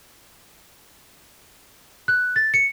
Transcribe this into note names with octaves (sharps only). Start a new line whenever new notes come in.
F#6
A6
C#7